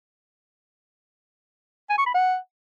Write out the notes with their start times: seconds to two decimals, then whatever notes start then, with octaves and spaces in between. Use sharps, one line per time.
1.90 G#5
1.98 C#6
2.06 B5
2.14 F#5